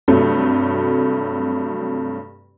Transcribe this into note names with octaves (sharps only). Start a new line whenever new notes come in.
G2 C3 F#3 A3